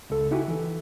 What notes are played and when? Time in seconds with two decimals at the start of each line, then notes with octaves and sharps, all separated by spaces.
0.10 C#2 A4
0.31 D#4 E4 F#4 G4 E5 G#5
0.48 E3 A4